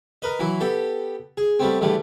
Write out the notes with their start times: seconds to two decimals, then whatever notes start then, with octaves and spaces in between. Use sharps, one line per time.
0.22 A#4 B4 D#5
0.40 E3 F#3 E4
0.60 B3 G4 A4
1.37 G#4
1.59 G3 A3 B3 C4
1.81 E2 A2 D3 G3 A3